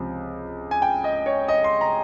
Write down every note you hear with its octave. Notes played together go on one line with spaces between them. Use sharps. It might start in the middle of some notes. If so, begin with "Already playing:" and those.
Already playing: C#2 C3 F3
G#5
G5
D#5
C#5
D#5
C6
A#5